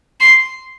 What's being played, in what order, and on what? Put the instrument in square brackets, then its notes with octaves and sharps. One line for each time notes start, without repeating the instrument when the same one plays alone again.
[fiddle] C6